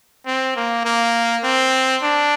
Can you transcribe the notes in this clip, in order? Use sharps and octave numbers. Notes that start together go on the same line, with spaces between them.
C4
A#3
A#3
C4
D4